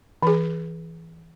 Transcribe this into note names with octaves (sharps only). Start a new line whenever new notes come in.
E3 G#4